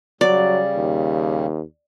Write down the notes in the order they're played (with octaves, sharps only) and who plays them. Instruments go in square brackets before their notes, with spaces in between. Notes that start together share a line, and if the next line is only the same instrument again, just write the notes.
[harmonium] C#3 G3 [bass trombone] F#3 [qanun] D5
[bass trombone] D#2